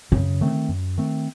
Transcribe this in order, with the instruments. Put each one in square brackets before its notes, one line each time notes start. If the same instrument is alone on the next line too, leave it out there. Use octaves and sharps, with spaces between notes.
[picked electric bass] F#2 [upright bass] C#3
[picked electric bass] D#3 A3 C4
F#2
D#3 A3 C4